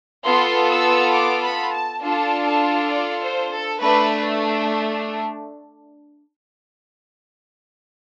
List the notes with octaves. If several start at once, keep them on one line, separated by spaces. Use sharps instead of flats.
B3 F4 A4 C6
E6
D6
B5
A5
D4 F4 A4 A5
A5
D5
C5
A4
A3 D4 B4